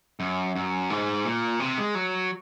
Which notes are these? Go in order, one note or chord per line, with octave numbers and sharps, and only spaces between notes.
F#2
F#2
G#2
A#2
C3
G#3
F#3